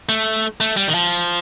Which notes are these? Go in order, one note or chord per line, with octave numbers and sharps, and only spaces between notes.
A3
A3
G3
D#3
F3